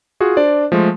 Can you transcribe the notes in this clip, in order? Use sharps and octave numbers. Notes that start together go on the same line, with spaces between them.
F4 F#4 G#4
D4 C5 D5
F3 G#3 A3